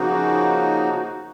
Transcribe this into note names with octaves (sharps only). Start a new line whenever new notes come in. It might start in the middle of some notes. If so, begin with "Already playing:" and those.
Already playing: C#3 F3 A#3 D#4 F#4